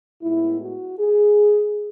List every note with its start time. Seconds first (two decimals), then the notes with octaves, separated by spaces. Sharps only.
0.22 A2 G#3 B3 E4
0.61 F#4
0.99 G#4